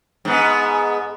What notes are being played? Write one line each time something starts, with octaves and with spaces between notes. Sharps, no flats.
G#2 B3